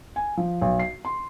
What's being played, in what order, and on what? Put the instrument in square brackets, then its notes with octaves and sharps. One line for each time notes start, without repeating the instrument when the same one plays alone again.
[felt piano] G#5
F3
B1
C7
C6